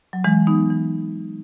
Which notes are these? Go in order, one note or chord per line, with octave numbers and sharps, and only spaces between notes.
F#3
E3 G#3
B3 D#4
E3